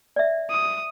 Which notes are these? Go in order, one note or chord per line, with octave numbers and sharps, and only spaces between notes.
D5 E5
D#6